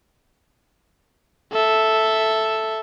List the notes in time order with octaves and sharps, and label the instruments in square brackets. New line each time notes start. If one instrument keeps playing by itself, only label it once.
[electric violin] A4 E5